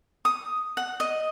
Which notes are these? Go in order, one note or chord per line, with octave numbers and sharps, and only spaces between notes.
D#6
F#5
D#5